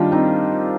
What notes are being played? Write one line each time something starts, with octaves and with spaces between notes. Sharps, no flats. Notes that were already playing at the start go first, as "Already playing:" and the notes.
Already playing: D#3 G3 D4 F4
C4 D#4